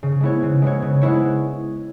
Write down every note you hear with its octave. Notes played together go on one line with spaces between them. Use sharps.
C#3
G#3 B3 E4 C#5
C#3
G#3 B3 E4 C#5
C#3
G#3 B3 E4 C#5